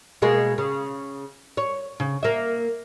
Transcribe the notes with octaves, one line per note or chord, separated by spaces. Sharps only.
B2 G#3 A#3
C#3
C#5
C#3
A#3 E5